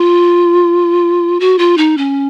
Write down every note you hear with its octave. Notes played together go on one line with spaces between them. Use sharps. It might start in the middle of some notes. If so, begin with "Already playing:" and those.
Already playing: F4
F#4
F4
D#4
C#4